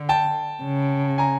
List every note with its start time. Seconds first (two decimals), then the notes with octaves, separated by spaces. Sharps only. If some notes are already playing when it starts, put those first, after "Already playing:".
Already playing: D3
0.09 G5 A5
0.63 C#3
1.18 G#5 A#5